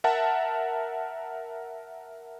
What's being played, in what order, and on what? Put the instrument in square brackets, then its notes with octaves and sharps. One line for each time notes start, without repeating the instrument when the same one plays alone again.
[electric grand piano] A#4 E5 F#5 A5